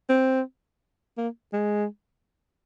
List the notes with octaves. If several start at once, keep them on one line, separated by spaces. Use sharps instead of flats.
C4
A#3
G#3